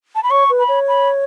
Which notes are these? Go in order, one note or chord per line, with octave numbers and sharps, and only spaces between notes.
A5
B5
C#5 C#6
B4
B5
C#5
B5